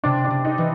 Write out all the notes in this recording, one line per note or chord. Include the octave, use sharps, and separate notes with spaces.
C3 D4
D4
C3
D#4
E3